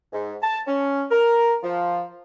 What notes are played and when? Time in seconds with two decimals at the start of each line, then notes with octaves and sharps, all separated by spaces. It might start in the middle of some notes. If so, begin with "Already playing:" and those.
0.13 G#2
0.42 A5
0.67 C#4
1.11 A#4
1.63 F3